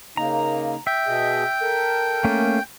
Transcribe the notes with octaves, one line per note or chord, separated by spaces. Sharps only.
C#3 A#3 D#4 A#5
E5 G5
B2 G#4 D#5
A4 A#4
A3 A#3 C#4